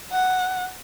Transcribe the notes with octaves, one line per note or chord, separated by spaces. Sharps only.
F#5